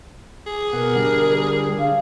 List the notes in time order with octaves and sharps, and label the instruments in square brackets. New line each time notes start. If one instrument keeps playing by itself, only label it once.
[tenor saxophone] G#4
[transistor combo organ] B2 F#5 [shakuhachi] A#4
[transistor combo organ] D3 G3
[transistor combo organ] D3 [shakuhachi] F5